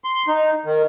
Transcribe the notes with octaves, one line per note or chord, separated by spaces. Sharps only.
C6
D#4
D#3